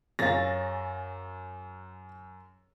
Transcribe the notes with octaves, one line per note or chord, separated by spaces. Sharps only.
F#2 G#4 C#5 F5 A6 A#6